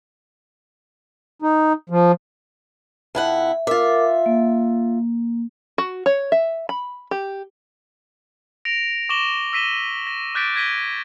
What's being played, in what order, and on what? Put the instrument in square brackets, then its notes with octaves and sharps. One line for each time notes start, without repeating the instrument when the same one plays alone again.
[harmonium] D#4
F3
[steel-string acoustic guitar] F2 E4 F#5 [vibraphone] E5
[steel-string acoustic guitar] F4 E5 [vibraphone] A#4 D6
[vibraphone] A#3
[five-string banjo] F#4
C#5
E5
B5
G4
[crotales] A#6 D7 F7
C#6 D6 A#6 E7 F#7 G7
E6 A#6 B6 D#7 E7 G7
A#6
D6 F#6 G6 A6 B6 D7
G#6 A#6 B6 D#7 G7